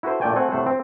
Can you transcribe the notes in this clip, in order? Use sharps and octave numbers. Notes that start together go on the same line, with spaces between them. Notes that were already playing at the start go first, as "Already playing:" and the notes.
E4 F#4 A4 B4 C5
A#2 A3 D5 G5 G#5
A3 C4 F#5 G#5
A2 C3 A3 C5 F#5
C4